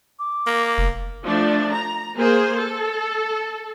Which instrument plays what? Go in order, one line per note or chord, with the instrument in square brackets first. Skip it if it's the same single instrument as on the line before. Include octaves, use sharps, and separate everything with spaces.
[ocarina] D6
[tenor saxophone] A#3
[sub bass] F1
[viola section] F3 A3 D4
A#5
A#3 G#4 C5
A4